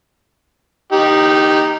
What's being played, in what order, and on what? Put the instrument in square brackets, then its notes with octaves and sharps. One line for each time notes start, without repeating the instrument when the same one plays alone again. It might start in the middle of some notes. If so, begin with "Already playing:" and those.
[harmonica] D#4 G4